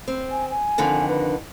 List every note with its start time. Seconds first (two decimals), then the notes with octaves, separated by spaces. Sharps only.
0.08 C4
0.30 G#5
0.50 G#5
0.78 F2 D3 D#3
1.08 B4